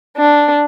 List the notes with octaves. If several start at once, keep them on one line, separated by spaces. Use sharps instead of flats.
D4